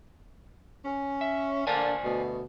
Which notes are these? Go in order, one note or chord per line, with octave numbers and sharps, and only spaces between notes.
C#4
E5
D3 A#3 D4 C5 D5 G#5
D2 B2